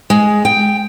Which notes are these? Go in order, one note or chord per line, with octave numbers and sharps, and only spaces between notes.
G#3
G5